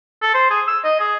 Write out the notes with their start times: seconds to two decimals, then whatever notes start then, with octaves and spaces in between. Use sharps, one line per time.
0.22 A4
0.34 C5
0.51 G#4
0.68 E6
0.85 D#5
0.99 G#4